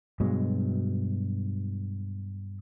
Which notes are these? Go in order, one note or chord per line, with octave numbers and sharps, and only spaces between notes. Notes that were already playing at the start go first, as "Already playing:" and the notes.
G2 B2 F#3 G#3